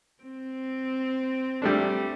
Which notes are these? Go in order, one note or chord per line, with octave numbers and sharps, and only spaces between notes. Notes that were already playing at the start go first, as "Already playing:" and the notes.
C4
G3 A3 D4